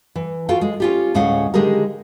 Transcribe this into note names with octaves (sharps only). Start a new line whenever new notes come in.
E3
F4 F#4 A4 F5 G5
G#3
C#4 F4 G4
D2 A2 G#3 C#4 F5 F#5
D3 D#3 G#3 G4 G#4 A#4